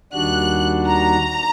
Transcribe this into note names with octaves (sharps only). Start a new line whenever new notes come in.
D#2 D#3 G3 D4 F#4 F#6
A#5